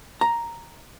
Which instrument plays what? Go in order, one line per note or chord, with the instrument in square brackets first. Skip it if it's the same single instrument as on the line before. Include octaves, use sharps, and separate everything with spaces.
[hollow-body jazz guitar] A#5